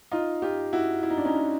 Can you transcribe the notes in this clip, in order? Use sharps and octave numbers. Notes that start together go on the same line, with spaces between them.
D#4 F4
F4 G4
E4 F#4
E4
D#4
D4
C#4 D#4